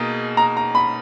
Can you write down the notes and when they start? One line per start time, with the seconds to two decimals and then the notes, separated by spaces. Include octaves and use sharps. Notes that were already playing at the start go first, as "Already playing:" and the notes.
Already playing: B2 A#3 D#4 G#4
0.37 A#5
0.57 A#5
0.75 B5